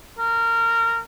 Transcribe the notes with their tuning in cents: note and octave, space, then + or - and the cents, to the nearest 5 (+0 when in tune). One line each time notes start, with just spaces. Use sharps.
A#4 -20